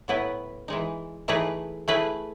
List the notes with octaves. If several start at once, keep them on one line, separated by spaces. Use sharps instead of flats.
A2 F#3 B3 E4 B4
E3 G#3 D#4
E3 A3 D#4 G#4 B4
A3 E4 G#4 B4